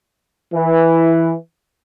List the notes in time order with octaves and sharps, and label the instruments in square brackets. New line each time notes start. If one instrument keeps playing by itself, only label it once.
[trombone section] E3